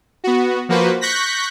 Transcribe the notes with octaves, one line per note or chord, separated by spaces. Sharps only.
B3 F#4
F3 A#3 F#4 B4 C5
C#6 F#6 G6 A#6 B6